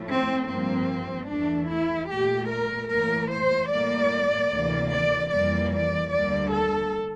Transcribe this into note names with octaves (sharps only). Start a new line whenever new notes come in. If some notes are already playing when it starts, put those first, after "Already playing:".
Already playing: A2 F3 A3
C4
G2 F3 A#3 C4
E2 E3 A3 D4
E4
A#2 A3 G4
A#4
A2 E3 A#3 A#4
C5
A2 G3 A#3 D5
D2 C3 E3 A#3
D5
F2 E3 G3 A#3 D5
D5
D2 D3 G3 A#3 D5
A4